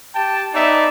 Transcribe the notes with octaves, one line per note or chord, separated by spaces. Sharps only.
G4 G5 A5
B3 D#4 D5 E5